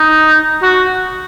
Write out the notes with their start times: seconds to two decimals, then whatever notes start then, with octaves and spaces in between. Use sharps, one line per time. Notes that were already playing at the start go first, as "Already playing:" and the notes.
Already playing: D#4
0.63 F#4